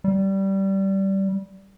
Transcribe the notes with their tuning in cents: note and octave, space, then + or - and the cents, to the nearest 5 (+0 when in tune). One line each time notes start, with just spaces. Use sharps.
G3 -15